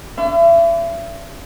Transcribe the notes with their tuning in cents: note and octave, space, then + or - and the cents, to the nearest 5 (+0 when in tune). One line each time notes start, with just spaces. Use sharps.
D4 -35 E5 +35 B5 +45